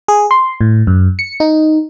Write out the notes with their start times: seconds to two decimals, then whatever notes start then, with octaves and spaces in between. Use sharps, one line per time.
0.08 G#4
0.31 C6
0.61 A2
0.87 F#2
1.19 C#7
1.40 D#4